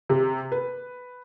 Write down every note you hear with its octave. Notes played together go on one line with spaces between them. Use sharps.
C3
B4